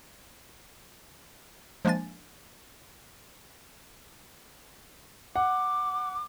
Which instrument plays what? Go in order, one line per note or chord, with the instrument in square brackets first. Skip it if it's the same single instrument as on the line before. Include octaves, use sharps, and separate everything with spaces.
[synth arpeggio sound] F3 G#3 A#3 D4 G#5 A6
[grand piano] F#5 [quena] D6